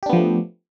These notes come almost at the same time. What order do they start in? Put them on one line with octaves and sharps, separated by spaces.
G4 D4 B3 F3 A3